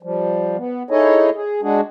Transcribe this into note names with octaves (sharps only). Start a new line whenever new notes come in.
F3 G3
B3
D#4 E4 G#4 A4 C#5 D#5
G#4
G#3 D4 F#4 G#4